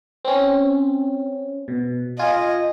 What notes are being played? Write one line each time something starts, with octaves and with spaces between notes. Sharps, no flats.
C4 C#4
B2
F4 D#5 G#5